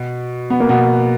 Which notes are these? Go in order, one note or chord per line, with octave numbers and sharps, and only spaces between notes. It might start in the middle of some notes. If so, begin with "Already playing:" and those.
Already playing: B2
B3
A#3
B2 B3